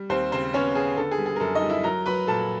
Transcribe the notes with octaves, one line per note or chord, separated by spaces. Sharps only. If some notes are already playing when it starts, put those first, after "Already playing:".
Already playing: G3
D#2 C4 C5
C#3 C4 C5
B3 C#4 C#5
B3 G#4
D3 A4
G#4
G3
G#4
A#4
F#2 A4
D#4 D#5
G3
E4 E5
F#3 A#4 A#5
F#3 B4 B5
A#2 A4 A5